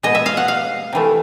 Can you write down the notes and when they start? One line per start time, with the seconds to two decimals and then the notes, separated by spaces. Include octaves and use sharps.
0.03 B2 G#3 D#5
0.15 E5
0.26 F5
0.37 F#5
0.48 F5
0.93 C3 E3 A3